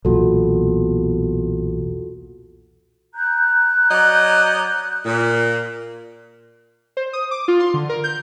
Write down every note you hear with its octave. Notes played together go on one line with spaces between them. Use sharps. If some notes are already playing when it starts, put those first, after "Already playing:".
B1 E2 A#2 F4 F#4 A4
A#5 F#6 G6
F#3 D5 D#5
A#2
C5
D#6
D6
F4
C6
D3
A#4
G6